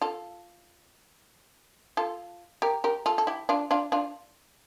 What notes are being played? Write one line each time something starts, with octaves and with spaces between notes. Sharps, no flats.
F4 A4
F4 A4
G4 A#4
G4 A#4
F4 A4
A4
E4 G4
D4 F4
D4 F4
D4 F4